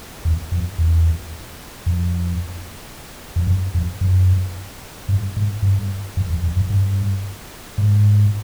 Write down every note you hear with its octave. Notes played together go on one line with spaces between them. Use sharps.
E2
F2
E2
F2
F2
F#2
F2
F#2
G2
G#2
G2
F#2
F2
F2
F#2
G2
G#2